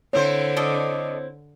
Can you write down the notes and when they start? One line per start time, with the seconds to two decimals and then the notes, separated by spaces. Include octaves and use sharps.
0.13 D3 C4 E4 C5 C#5
0.56 A4 D5 D#5